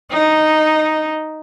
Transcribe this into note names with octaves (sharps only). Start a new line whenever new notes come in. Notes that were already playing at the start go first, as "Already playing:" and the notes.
D#4